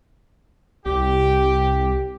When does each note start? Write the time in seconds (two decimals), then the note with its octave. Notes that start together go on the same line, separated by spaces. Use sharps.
0.86 C2 G4